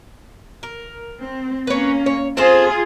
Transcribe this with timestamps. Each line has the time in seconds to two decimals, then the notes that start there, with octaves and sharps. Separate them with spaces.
0.63 A#4
1.19 C4
1.67 A#3 C#4 B4 C#5
2.06 C#5
2.37 C4 F4 G#4 A4 C5